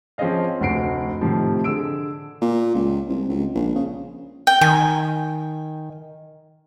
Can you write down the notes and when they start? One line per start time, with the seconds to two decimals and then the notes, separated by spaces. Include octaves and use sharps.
0.18 F3 C4 C#4 G#4 D#5 F5
0.60 F1 D2 F#4 C7 D7
1.21 A2 C3 D#3 F3
1.64 D3 G#4 E6 D7
2.41 A#2
2.75 C#2
3.09 C2
3.28 C#2
3.55 A#1
3.75 C#3
4.47 G5
4.61 D#3 G#5